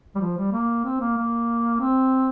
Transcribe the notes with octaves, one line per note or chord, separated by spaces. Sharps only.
G3
F3
G3
A#3
C4
A#3
A#3
C4